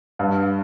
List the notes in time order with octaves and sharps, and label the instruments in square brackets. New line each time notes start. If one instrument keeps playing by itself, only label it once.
[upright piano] G2